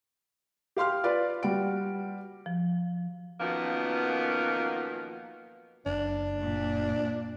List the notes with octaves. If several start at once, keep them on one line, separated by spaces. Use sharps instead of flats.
G4 F5 C6 F6
F4 B4 D5 F5
G3 F#4 D7
F3
F#2 B2 D#3 F3 A#3 B3
F#1 D4
A#2